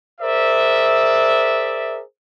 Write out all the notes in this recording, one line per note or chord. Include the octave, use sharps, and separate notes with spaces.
G#4 A#4 C5 D5 E5